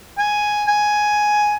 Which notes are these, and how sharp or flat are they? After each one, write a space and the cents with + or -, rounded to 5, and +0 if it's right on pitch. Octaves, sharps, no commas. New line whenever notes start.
G#5 +5
G#5 +10